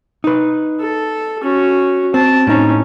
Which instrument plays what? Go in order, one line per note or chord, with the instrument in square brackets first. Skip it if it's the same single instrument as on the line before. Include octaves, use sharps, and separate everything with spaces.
[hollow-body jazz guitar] D#4 B4
[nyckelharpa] A4
C#4 F#4
[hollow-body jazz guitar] C4 [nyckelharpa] A5
[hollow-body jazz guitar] A2 D#4 [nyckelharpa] C#4